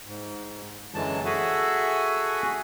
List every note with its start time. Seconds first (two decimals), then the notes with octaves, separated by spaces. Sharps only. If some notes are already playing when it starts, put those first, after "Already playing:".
0.07 G#2
0.94 F#2 D3 E3 F#3 G#3 A5
1.25 F#4 G#4 A4 E5 F#5 G#5